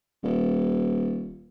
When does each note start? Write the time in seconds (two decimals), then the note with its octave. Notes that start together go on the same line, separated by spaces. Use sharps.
0.24 D#1